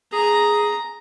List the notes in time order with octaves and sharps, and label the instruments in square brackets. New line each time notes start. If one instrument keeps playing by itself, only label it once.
[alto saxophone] G#4 [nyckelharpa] A#5